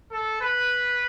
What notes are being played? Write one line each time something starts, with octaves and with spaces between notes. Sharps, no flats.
A4
B4